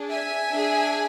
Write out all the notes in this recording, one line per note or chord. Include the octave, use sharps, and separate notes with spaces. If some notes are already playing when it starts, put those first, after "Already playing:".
Already playing: D4 G#4
E5 G#5
D4
G#4